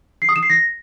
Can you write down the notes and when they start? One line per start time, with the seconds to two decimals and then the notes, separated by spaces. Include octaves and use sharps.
0.22 C7
0.29 D#6
0.36 E7
0.43 C7
0.50 A#6